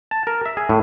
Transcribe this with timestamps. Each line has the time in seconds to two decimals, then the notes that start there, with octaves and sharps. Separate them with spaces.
0.11 A5
0.27 A#4
0.46 E5
0.57 G#4
0.69 A2